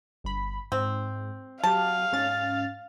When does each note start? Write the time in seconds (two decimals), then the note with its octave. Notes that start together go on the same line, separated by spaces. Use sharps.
0.24 G1 B5
0.72 G#2 C4
1.64 F#3 G4 F5 A5
2.13 G#2 C#4 A6